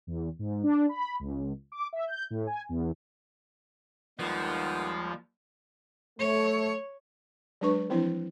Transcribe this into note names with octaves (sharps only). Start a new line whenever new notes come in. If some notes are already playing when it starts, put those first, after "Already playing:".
E2
G#2
D4
B5
C#2
D6
E5
G6
A2
G#5
E2
D#2 D#3 F3 G3 G#3 B3 F#5
A3 C#5
F#3 G#3 D4 B4 C#6
E3 F3 C4 D4 E4